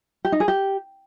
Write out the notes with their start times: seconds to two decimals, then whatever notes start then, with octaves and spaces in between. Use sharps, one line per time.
0.25 G4
0.32 D#4
0.40 G#4
0.48 G4